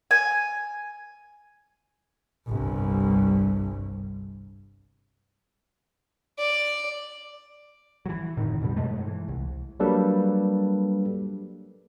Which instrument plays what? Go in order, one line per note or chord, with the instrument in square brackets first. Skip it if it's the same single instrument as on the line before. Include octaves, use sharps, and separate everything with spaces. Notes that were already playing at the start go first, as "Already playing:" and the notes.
[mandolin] G#5
[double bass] G1 C2
[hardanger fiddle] D5
[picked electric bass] E3 F#3
F#1 A2 D3 D#3
F2 B2 D3 G3
G2 B2 G#3 A3
E3
C2
[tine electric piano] F#3 G3 A#3 D4 A4 B4